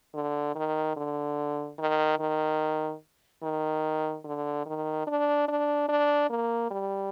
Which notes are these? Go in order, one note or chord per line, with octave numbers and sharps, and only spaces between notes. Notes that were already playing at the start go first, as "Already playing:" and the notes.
D3
D#3
D3
D#3
D#3
D#3
D3
D#3
D4
D4
D4
A#3
G3